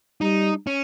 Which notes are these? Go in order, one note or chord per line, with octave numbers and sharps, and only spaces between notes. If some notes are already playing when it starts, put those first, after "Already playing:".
G3 D#4
C#4